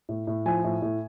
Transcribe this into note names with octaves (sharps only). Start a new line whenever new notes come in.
A2
A2
F3 G#5
A2
A2